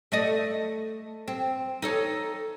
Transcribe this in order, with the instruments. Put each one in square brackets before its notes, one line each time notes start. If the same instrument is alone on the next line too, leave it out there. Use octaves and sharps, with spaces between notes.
[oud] A3 D5 D#5
C4
D#4 A4 C#5